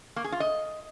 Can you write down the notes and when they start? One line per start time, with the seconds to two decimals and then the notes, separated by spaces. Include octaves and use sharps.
0.16 A#3
0.24 G#4
0.32 F4
0.40 D#5